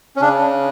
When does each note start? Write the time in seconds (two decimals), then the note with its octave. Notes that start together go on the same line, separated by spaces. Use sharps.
0.16 C#4
0.21 C#3 D4